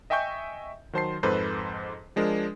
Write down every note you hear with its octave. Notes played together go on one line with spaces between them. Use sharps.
D#5 E5 G5 G#5 C#6 G6
D#3 F#3 C5 A5 C6 C7
F2 G#2 A4 B4 C5
F3 G#3 D4 G#4 A#4